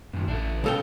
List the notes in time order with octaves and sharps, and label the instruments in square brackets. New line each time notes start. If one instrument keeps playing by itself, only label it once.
[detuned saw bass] F#2 [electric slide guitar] A2 D#3
[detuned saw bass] A1 [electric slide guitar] D4 E4 A4
[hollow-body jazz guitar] B1 A4 G5 [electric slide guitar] F#3 C#4 F5